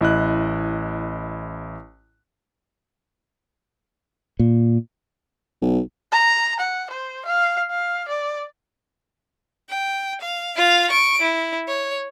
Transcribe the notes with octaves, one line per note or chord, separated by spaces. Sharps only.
A1 E4 D#5 F#6
A#2
B1
A#5
F#5
C5
F5
F5
D5
G5
F5
F4 F5
C#6 D7
E4
C#5